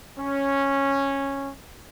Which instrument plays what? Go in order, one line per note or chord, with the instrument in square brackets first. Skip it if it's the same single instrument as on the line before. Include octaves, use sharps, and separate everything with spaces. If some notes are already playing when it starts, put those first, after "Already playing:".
[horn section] C#4